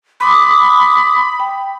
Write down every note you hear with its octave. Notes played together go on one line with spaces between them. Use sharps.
B5 C6 D6 D#6
G5